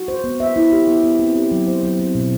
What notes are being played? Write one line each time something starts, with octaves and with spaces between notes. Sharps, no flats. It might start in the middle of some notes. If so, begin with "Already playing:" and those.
Already playing: F#4
C5
B3
E5
E4
G4
B3
B3
C4
G4
F#3
C5
F#3
C4
B2